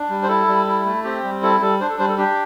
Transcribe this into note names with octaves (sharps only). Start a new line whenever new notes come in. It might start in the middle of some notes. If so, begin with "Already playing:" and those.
Already playing: D4
G3
C5
E4 A4
G3
E4
A3
C4 G4
G3
E4 A4
G3 A4
D4 C5
A4
G3 C5
A4
D4 G4